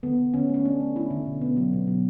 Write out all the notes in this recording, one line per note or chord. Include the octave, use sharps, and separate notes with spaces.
D3 B3
D3
D3 C#4
A3 C#4
A3 D4
A3
A3 E4
D3
B2
B3
F#3
B2
F#3